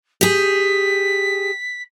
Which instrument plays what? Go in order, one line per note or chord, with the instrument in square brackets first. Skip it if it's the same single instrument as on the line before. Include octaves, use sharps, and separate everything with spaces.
[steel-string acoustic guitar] G4 G#4 [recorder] B6